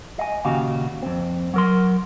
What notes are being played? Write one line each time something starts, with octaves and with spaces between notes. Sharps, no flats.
D#5 G#5
D#2 A#2 C#3 F#4 G4 F5
F2 C4
F#3 A#4 C6